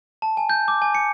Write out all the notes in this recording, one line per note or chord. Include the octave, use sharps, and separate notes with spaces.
A5
G#5
G6
D6
G#5
C#7